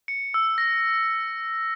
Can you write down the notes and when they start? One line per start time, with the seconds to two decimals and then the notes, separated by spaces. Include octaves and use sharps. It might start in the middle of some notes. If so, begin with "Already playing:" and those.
0.08 C#7
0.34 E6
0.58 A#6